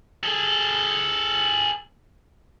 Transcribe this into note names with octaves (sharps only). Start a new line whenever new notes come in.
G#4 A4